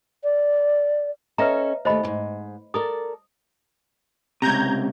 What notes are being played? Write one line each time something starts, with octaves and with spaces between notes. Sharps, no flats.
D5
C#4 A4 B4 D#5 E5 A#5
D#2 A3 C5 D#5 B5
F2 G#2
A4 A#4 D5 D#6
C#2 C3 A#5 G6 G#6